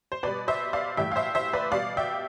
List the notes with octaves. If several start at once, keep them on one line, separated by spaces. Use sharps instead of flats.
C5
B2 G3 B4 D5
C5 E5
D5 F5
A2 E3 G3 E5 G5
F5
C5 E5
C5 E5
B4 D5
B2 G3 D5 F5
E5 G5